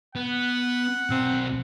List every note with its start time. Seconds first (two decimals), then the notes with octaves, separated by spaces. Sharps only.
0.16 B3 F#5
1.10 B1 C4 C5